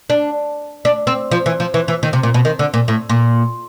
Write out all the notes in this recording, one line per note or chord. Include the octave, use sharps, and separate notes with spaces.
D4
D4
C4
F3
E3
F3
E3
E3
D#3
C3
A#2
B2
D#3
D3
A#2
A2
A#2